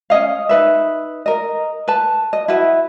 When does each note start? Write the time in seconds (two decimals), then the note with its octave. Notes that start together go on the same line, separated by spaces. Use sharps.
0.10 C#4 F4 D#5 F5
0.49 D#4 B4 E5
1.26 A#4 D#5
1.88 B4 A5
2.33 D#5
2.48 E4 F#4 B4 E5